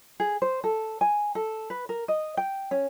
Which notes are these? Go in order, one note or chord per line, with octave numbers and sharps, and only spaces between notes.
G#4
C5
A4
G#5
A4
B4
A#4
D#5
G5
C#4